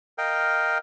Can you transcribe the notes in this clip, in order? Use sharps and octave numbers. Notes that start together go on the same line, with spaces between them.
A#4 D#5 F5 G5